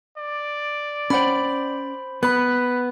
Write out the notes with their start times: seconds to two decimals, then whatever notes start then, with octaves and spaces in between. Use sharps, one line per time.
0.18 D5
1.10 C#4 C5 F#5 G5 B5
2.23 B3 B4 B5 F#6